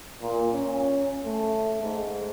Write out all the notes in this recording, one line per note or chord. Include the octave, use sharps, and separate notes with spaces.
A#2
C#4
A3
G#2